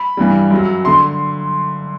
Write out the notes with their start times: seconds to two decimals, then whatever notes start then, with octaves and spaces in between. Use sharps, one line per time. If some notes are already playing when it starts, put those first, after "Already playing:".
Already playing: B5
0.17 G2 E3 G3
0.51 F#2 F#3
0.85 D3 C6